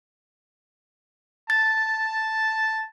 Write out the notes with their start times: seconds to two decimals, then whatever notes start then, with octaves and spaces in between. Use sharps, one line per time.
1.50 A5 A6